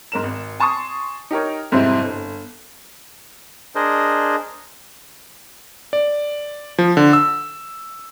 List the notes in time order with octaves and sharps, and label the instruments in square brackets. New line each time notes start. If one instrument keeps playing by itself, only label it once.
[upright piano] G#2 A#4 E7
G#1
G#5 A5 C6 C#6 D#6
D#4 G4 A#4 C#5
F2 G#2 C3 G3 C4 E4
G1
[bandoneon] D4 G#4 A#4 C5 D#5
[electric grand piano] D5
F3
D3
E6